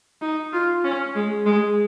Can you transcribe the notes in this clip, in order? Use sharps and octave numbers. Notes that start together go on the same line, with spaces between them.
D#4
F4
C#4
G#3
G#3